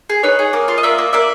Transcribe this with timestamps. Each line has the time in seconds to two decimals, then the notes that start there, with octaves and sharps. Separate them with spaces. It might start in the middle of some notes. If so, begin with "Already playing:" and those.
0.09 G#4
0.23 D#4 B4 C#5
0.39 G#4
0.53 A#3
0.68 F4
0.78 D#5
0.83 A#3 D5 E5
0.98 A#3
1.13 A#3 D5 E5